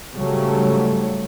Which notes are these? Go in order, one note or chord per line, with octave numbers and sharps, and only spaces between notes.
G#2 C#3 F#3 G3 A3